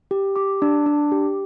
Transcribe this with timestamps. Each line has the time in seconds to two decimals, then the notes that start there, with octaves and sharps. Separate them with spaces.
0.11 G4
0.36 G4 D6
0.62 D4
0.86 D4
1.12 G4